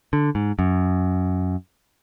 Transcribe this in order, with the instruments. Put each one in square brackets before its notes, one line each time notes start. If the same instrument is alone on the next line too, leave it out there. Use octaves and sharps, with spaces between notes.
[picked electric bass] D3
G#2
F#2